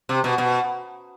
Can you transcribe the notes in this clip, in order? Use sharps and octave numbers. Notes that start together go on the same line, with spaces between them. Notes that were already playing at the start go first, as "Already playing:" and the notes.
C3
B2
B2